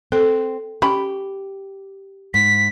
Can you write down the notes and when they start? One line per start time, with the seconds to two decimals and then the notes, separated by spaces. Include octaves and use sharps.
0.12 C4 A4
0.82 C#4 G4 B5
2.34 G#2 B6